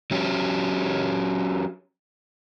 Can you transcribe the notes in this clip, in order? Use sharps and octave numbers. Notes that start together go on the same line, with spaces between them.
F#3 C#4 G4